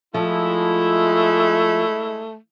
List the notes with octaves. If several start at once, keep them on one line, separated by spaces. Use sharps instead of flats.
F3 G#3 A3 E4